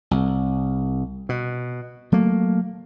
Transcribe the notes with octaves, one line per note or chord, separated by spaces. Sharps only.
C2
B2
F#3 A3 A#3